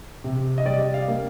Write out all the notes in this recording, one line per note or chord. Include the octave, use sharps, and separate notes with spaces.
C3
D#5
G3 D5
F5
A#3